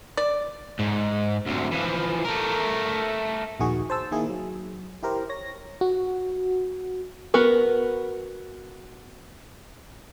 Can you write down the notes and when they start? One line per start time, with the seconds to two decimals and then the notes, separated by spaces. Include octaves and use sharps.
0.17 D5
0.79 G#2
1.47 D2 C3
1.72 E3 F3
2.25 A3 A#4
3.60 A#1 D#2 D#3 F#4 G#4 C#6
3.90 C5 A5 E6
4.11 D#3 A#3 E4 G#4
4.29 F#3
5.03 E4 G4 A#4 C5
5.29 C#5 A#6
5.81 F#4
7.34 B3 F#4 A#4 B4